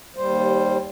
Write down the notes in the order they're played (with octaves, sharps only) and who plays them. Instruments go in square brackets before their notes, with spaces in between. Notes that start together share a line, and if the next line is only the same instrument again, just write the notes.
[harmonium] D#2 G3 C5